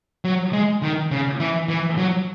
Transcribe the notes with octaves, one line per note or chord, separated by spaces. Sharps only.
F#3
G#3
D#3
C#3
E3
E3
F#3